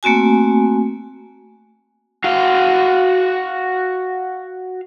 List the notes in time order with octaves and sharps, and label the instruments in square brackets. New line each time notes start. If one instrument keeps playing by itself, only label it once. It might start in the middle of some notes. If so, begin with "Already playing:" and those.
[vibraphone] A3 A#3 C4 F#4 G#5
[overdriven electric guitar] F#4 F5